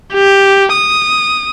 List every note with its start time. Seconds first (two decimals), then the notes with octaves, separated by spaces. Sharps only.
0.14 G4
0.73 D#6